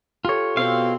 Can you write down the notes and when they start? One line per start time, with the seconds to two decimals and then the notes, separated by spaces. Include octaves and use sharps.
0.25 F4 G4 A4 C#5
0.57 B2 C4 F5